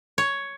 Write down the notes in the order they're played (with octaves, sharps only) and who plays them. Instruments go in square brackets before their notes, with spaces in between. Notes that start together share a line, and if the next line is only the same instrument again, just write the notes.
[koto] C#5